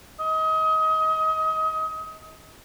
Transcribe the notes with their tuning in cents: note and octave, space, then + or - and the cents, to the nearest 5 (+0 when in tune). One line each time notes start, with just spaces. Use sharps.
D#5 +30